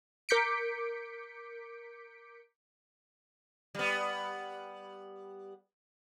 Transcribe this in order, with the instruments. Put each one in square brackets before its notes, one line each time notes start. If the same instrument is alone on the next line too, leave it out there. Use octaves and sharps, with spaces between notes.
[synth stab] A#4 D6 G6 B6 C#7 D7
[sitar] G3 B3